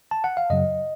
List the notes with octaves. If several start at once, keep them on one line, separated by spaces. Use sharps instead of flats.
A5
F#5
F5
F#2 C#3 F#3 D#5